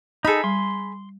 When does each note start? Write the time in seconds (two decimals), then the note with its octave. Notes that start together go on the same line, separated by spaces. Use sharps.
0.25 D#4 G#4 A4 B5
0.44 G3 C6